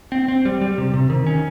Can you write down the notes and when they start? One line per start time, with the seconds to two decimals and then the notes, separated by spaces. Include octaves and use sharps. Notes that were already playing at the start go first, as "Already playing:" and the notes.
0.12 C4
0.28 C4
0.45 G3
0.61 G3
0.78 C3
0.94 C3
1.10 D#3
1.27 C#4